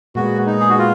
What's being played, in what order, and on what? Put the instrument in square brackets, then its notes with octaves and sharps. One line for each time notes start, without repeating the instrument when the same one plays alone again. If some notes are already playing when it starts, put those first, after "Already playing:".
[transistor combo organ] A#2 G#3 B3 [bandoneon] F#4
[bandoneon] D#4
G#4
F#4
F4